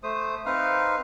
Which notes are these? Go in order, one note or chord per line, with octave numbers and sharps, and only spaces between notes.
A3 C5 D#6
C4 D#4 B4 F5